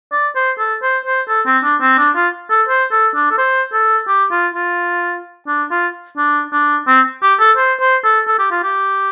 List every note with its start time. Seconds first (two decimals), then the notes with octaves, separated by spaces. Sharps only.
0.12 D5
0.35 C5
0.59 A4
0.82 C5
1.05 C5
1.29 A4
1.46 C4
1.64 D4
1.81 C4
1.98 D4
2.16 F4
2.51 A4
2.69 C5
2.92 A4
3.15 D4
3.31 A4
3.38 C5
3.73 A4
4.08 G4
4.31 F4
4.55 F4
5.48 D4
5.71 F4
6.17 D4
6.53 D4
6.88 C4
7.22 G4
7.40 A4
7.57 C5
7.80 C5
8.04 A4
8.27 A4
8.39 G4
8.51 F4
8.63 G4